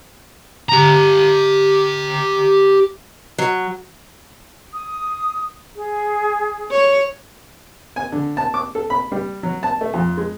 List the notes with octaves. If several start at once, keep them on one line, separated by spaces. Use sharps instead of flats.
G4 A#5
F#3
D#6
G#4
C#5
G#5
D3
A5
D6
A4
B5
G3
F#3
A5
A3
F2
G#3